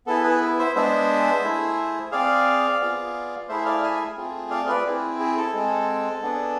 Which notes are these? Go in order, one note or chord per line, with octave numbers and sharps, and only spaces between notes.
B3 E4 G#4 A4
G#4 B4
C5 E5
G#3 B3 D4 G#4 C5 E5
A3 E4 G#4
C4 G#4 D5 F5
B3 F4 G#4
A3 E4 G#4 C5 E5
D5 F5
E5 G#5
A3 C4 F4 G#4
D5 F5
B4 D5
C4 E4 G#4
G#4
A4
G#3 C4 G#4
B3 D4 G#4